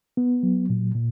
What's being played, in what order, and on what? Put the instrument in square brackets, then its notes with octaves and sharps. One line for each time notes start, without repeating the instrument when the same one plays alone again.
[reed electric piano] B3
F#3
A#2
A#2